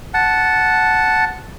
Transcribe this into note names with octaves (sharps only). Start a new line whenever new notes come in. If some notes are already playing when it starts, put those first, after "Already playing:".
F#5 A5